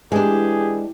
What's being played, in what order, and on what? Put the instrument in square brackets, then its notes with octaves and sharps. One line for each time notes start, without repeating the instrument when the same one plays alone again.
[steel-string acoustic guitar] E3 [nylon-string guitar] G#3 D4 [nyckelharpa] G4 [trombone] G#4